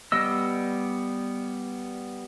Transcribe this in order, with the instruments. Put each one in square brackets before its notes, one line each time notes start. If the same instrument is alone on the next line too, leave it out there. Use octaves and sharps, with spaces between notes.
[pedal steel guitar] G3 B3 D#5 E6